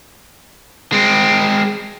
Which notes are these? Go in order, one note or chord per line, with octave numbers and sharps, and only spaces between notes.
G#3 C4